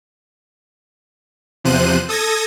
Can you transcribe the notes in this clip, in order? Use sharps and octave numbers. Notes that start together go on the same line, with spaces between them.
E2 C3 F3 C5 F#6 D#7
A4 D#6 G#6 A#6